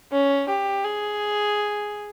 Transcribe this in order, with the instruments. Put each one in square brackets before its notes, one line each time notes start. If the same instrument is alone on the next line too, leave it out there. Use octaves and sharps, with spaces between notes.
[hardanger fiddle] C#4
G4
G#4